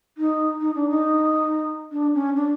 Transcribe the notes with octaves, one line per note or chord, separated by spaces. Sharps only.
D#4
D#4
D4
D#4
D4
C#4
D4